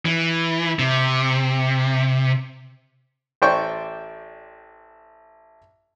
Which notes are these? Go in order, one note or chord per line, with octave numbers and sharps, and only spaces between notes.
E3
C3
A1 C5 D5 G5 C#6